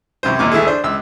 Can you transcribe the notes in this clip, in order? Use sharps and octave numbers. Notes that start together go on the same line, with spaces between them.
C2 F#2 C5
D#2 A#2 D6
D2 E4 G#4 A4
D4 C5
C#2 E6